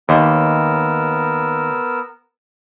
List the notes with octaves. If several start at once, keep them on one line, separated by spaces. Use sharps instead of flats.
D#2 B3 A#4 E6